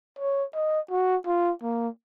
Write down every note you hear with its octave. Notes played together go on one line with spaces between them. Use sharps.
C#5
D#5
F#4
F4
A#3